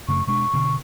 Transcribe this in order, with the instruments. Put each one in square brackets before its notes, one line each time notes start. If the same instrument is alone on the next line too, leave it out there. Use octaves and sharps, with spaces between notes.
[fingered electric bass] F#2 C#3 A3 [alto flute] C#6
[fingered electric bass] B2 G#3 D4 [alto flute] C#6
[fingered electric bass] B2 D3